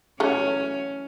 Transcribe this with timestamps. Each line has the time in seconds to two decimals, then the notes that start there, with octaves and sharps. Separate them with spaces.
0.20 E3 F#3 A3 C#4